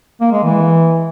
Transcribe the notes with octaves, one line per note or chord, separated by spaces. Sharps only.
A#3
G#3
E3